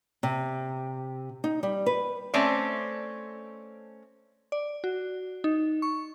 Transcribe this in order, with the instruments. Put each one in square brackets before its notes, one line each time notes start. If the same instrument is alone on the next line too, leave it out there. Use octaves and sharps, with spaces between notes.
[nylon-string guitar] C3
D#4
G3
B4
[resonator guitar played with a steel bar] A3 C4 C#4 C5 D5
[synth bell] D5
F#4
D#4
C#6